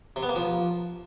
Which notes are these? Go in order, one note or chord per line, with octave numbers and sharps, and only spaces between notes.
C3
B3
A#3
F3